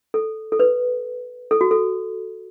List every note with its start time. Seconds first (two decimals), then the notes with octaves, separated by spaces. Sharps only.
0.14 A4
0.52 A4
0.60 B4
1.51 A4
1.61 F#4
1.71 A4